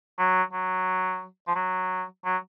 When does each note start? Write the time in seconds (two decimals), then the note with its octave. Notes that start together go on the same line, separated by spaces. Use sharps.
0.18 F#3
0.53 F#3
1.47 F3
1.55 F#3
2.25 F#3